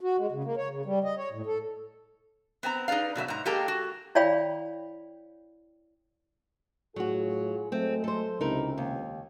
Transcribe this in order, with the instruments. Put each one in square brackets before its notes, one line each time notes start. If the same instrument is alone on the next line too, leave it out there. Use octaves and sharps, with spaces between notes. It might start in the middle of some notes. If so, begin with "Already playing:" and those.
[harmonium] F#4
G#3
C#3
A#3
C#5
C#3
G3
D#5
C#5
A2
A4
[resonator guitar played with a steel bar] B3 C4 G#5 A#5
D#4 G#4 B4 D5 F5
B2 F#3 B4 E5
G#2 A#5
G#3 A#3 G4 A4 G5 A#5
F#4
[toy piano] E4 C#5 D5 F5 G5 B5
[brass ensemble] A2 F4 G#4 [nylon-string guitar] F#3 F#4
[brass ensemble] F#3 G#3 A3 [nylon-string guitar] C4
[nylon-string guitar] A4 C5
[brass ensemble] C#2 C3 [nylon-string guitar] D#4 E4 A#4
[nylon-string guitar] D#2